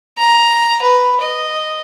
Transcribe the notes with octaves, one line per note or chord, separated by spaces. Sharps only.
A#5
B4
D#5